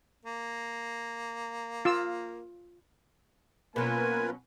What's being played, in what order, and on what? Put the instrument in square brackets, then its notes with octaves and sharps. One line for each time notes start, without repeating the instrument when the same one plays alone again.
[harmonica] A#3
[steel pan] F4 E6
[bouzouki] B2 F#3 C#4 [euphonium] A#3 [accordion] F4 A#4 B4 [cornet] G#5